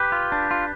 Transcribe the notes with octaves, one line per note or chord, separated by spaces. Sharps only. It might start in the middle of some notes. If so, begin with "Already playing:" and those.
Already playing: G4 B4
F4
D4
F4